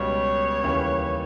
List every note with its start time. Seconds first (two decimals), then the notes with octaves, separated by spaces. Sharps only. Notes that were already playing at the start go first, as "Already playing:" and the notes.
Already playing: C#2 B2 G3 C#5
0.63 D#2 C#3 E3 G3